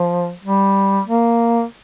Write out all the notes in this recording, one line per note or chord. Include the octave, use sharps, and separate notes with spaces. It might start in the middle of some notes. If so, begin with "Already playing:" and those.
Already playing: F3
G3
A#3